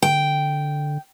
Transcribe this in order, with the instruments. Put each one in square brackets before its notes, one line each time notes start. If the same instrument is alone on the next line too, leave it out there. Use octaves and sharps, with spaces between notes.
[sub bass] D3 [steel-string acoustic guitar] G5